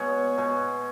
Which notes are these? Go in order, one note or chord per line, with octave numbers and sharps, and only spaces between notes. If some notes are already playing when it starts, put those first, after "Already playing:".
Already playing: B2 G#3 C#5
B2 G#3